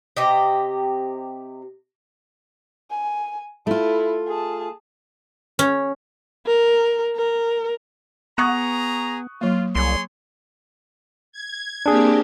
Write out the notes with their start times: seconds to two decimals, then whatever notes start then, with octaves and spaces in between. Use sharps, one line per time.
0.17 C3 G4 D#5
2.91 G#5
3.67 A3 E4 F4
4.28 G#4 A5
5.59 C#4
6.46 A#4
7.17 A#4
8.38 B3 G#4 A#5 C#6 D#6 F#6
9.41 F#3 A#3 F4
9.75 C2 G#4 C#5 C6
11.32 G#6
11.86 A#3 C4 D4 G4 G#4